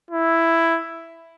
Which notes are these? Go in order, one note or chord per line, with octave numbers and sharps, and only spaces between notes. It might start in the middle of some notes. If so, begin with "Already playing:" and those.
E4